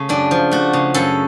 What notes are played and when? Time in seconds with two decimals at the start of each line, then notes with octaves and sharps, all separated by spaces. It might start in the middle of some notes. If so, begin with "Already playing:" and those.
Already playing: C#3 A3
0.09 F#2 D4
0.31 F3
0.51 A3 F#4
0.73 C#3
0.94 F#2 A4